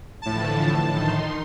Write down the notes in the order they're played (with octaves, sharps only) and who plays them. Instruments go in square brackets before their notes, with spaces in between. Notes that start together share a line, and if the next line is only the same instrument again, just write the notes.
[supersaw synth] A2 A5 [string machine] D3 E3 F3
[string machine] D#3 D#4 C6